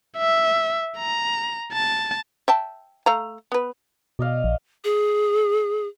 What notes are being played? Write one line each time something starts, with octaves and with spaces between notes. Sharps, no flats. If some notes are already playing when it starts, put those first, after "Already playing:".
E5
A#5
A5
E5 G5 A5
A3 F5 A#5
B3 B4
B2 D5 D#5 F5
A#1
G#4